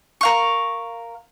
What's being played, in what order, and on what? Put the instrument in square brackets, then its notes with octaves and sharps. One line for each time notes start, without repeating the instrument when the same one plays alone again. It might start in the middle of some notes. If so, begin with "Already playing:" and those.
[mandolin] A#4 F5 C#6